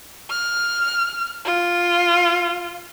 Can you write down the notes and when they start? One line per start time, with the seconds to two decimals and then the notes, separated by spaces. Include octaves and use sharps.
0.30 F6
1.45 F4